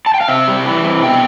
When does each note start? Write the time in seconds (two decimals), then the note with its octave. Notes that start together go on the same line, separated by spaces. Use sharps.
0.06 A5
0.14 G5
0.21 F5
0.28 C3 E5
0.48 G3
0.65 E3
0.84 C3
1.03 B2 G5